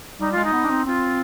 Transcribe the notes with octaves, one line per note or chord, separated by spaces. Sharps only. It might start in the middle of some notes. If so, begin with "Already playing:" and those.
G3 D#4
G#3 F4
D#4
B3
D4
C4
C4 F4